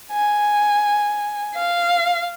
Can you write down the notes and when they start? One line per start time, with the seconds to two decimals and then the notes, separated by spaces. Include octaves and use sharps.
0.12 G#5
1.55 F5